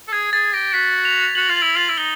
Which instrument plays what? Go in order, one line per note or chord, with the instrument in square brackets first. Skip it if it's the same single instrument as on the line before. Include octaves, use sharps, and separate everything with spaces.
[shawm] A4
[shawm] G#4 [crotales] G#6
[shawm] G#4 [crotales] A6
[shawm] G4 [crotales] A#6
[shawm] F#4 [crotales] B6
[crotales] F7
[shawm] F#4 [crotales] F#7
[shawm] F4
[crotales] F#7
[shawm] E4
[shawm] F4 [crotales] F#7
[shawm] E4
[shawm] D#4 [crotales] G7